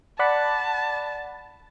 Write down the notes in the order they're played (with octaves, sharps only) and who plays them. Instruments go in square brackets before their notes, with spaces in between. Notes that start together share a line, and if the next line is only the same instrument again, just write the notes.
[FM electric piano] D5 F#5 B5 [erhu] A5